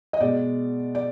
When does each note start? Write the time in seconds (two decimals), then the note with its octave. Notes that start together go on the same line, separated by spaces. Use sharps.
0.13 D#5
0.20 B2 G#3 D5
0.95 D5